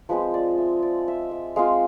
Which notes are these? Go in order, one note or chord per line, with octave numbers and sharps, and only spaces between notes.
F3 G#3 C4 B4
D5
E5
D5
E5
E5
G#3 C4 F4 F5